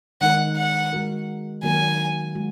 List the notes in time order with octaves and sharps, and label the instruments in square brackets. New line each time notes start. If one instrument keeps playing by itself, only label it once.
[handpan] D#3 G#3 D#4 A#4 [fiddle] F#5
[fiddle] F#5
[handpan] G#3 F#4 A#4
[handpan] D#3 F#3 A#3 F#4 A#4 [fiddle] G#5
[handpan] G#3 F#4